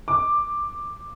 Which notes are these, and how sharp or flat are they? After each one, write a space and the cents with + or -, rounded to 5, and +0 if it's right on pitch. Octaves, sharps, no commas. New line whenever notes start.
D6 +10